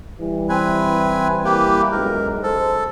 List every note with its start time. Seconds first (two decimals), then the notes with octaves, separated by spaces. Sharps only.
0.20 E3 G3
0.49 C4 B4 G#5
1.45 A#3 G4 B4
1.92 B1 F#2 G#3 A#4
2.43 G#3 A4 C5